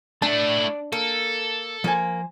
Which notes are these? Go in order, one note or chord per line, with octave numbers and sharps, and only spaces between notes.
A3 D4 E4 A5
A#3 A4
F3 A#3 C5 G#5